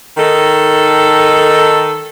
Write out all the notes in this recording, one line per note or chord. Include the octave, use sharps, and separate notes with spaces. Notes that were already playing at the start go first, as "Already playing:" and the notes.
D#3 A4